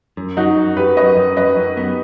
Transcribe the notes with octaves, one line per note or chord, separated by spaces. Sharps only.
F#2
F#3 D#4 F#4
F#2
F#2 G4 B4
F#2 B4 D#5
F#2
F#2 B4 D#5
F#2
B3